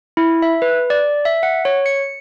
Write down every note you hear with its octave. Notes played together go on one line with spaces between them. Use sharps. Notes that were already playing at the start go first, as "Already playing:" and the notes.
E4
E5
B4
D5
E5
F#5
C#5
C#7